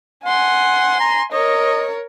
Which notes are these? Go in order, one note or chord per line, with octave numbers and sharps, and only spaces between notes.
F#5 G#5 C6
A#5
A#4 C#5 D#5